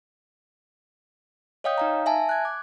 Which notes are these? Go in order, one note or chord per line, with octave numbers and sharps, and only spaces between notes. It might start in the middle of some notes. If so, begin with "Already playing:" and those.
C#5 D#5 F5 G5 D#6 G6
D#4 F5 A#5
E5 G#5 A5
F#6 G#6
D6